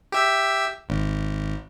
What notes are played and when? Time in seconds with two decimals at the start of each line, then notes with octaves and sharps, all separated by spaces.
0.12 G4 E5 E6
0.89 G#1